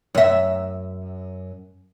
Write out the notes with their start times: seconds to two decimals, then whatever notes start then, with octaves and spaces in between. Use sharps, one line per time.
0.15 F#2 E5